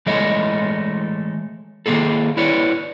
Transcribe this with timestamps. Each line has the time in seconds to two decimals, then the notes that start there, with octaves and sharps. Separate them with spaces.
0.06 E3 G#3 A3 C#5 D#5
1.86 D#3 E3 A#3 G#4 A4
2.37 E4 B4 C#5 D5